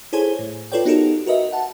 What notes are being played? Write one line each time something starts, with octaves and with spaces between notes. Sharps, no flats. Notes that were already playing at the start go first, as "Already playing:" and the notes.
E4 G#4 A4 C5 C#5 G#5
A2
F4 A4 B4 C#5 D5 G5
B3 D#4 F#4 G4 A4 A#4
F#4 A#4 B4 D#5 E5
F#5 A5